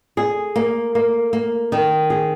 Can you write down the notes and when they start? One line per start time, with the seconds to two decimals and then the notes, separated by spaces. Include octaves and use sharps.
0.17 G#4
0.56 A#3
0.95 A#3
1.33 A#3
1.72 D#3
2.10 G#4